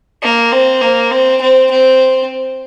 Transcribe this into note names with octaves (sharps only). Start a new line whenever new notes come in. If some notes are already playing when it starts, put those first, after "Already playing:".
A#3
C4
A#3
C4
C4
C4